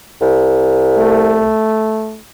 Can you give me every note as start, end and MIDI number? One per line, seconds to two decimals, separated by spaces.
0.21 1.51 36
0.98 2.20 57